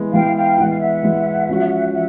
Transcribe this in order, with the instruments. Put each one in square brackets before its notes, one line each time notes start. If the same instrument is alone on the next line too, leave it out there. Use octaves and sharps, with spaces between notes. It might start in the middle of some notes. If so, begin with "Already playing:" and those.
Already playing: [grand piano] E3 G#3 B3
[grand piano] E3 G#3 B3 [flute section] F5 G5
[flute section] F5 G5
[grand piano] E3 G#3 B3 [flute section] F#5
[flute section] F5
E5 F#5
[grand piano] E3 G#3 B3
F3 G#3 C#4 F#4
[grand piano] F3 [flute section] E5 F#5